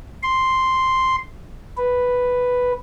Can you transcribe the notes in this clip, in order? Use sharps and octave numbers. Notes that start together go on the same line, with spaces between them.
C6
B4